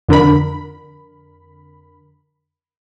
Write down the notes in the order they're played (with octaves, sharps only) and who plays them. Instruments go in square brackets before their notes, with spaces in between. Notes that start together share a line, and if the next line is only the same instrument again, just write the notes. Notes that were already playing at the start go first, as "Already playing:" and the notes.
[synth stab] F2 D3 A#4 B5